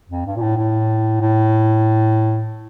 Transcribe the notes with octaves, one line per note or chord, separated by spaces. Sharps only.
F2
G2
A#2
A2
A2
A2